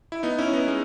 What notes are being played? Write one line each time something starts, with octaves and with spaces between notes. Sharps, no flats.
E4
B3 D#4
C#4 E4
B3 D#4
G#3 B3